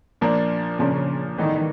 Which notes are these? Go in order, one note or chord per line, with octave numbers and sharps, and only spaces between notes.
A#2 F3 A#3 D4
A#2 C#3 F3 A#3 D4
A2 D#3 E3 G3 B3 D#4